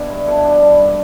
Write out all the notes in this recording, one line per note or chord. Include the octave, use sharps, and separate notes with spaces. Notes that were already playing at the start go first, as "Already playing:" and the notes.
Already playing: B2 B3 D4 E4 G4
G2
B2 E4 A4
B2 D4
G3
G2